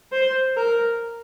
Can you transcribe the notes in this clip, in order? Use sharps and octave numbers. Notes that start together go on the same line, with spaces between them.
C5
A#4